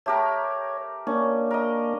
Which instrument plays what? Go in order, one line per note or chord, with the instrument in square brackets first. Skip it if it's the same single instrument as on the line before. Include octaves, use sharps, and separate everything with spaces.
[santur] A3 G4 A#4 [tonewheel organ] C#5
[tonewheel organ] A#3 D4 [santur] C#4
[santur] A#4 D#5